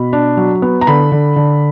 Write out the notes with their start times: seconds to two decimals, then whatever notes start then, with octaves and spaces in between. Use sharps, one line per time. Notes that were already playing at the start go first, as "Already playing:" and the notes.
Already playing: B2 B5
0.13 D4
0.37 F#3
0.62 B3
0.81 A#5
0.87 D3 B5
1.12 D3
1.36 D3